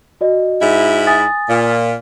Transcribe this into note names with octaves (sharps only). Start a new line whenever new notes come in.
F#4 D5 D#5
G#2 E4
G#5 D#6 A6
A#2